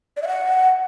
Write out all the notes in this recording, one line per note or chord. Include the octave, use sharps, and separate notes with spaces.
D5
E5
F#5